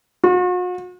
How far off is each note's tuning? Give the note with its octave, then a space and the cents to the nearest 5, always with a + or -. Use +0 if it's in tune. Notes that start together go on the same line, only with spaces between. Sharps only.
F#4 -45